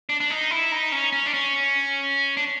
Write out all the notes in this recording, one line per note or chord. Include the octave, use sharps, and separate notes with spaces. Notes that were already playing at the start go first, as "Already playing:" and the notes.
D4
D4
D#4
E4
D#4
C#4
C#4
D4
C#4
D4